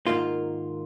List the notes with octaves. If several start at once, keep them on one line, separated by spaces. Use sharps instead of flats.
G#2 D#3 A#3 F4